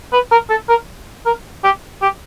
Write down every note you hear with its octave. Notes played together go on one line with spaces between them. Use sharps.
B4
A#4
A4
A#4
A#4
G4
G4